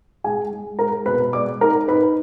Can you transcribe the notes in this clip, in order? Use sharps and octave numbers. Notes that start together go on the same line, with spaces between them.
G#3 G#4 G#5
G#3
G#3 A#4 A#5
B2 B4 B5
G#3 D5 D6
D#4 A#4 A#5
D#4 B4 B5